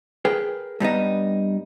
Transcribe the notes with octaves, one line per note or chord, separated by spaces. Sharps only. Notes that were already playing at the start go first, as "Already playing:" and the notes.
G#4 A#4 B4 G5
G2 G3 B3 D#4